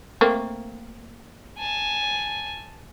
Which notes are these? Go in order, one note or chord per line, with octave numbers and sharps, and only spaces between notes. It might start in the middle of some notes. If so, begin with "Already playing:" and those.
A3 A#3 C4
G#5 A5